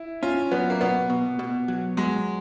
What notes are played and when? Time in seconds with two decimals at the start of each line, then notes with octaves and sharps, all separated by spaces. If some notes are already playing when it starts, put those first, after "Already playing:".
Already playing: E4
0.23 C#4 F4
0.51 F#3 B3
0.70 A#3
0.81 B2 B3
1.10 B2
1.39 B2
1.68 F#3
1.97 F#3 G#3